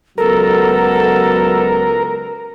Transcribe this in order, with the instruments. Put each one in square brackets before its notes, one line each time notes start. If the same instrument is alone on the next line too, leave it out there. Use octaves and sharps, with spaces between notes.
[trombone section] C#2 F#3 B3 [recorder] A4 [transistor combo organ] A#4